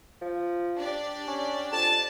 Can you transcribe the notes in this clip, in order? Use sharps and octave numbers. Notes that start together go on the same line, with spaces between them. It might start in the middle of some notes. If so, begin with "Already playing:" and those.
F3
D4 G4 D5
C#4
F2 A5